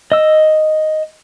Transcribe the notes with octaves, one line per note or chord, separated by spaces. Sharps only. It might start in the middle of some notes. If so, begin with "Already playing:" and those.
D#5 E6